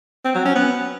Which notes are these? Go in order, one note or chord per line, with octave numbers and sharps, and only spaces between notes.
C4
F#3
C#4
B3